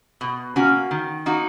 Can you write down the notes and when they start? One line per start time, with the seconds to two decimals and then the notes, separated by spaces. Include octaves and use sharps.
0.21 B2
0.56 A#3 C#4 F#4
0.91 D#3
1.26 A#3 D#4 F#4